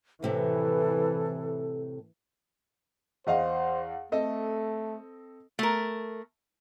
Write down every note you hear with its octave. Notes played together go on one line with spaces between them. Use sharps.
A2 C3 E3 A3 A4
E2 C5 D#5 F5
A3 C4 A4 D#5
A3 A#4